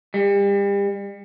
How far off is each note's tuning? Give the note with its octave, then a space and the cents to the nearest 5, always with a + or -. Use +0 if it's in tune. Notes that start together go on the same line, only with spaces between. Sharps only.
G3 +35